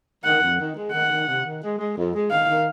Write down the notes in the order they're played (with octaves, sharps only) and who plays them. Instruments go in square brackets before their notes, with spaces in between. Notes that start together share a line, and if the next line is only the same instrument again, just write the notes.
[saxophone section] D#3 [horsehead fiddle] F#5
[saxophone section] F2
D#3
G#3
[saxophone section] D#3 [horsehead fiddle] F#5
[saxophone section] D#3
C3
D#3
G#3
G#3
F2
G#3
[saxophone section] D#3 [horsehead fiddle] F5
[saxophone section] D#3